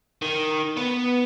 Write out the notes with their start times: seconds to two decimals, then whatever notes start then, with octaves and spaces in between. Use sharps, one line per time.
0.22 D#3
0.77 B3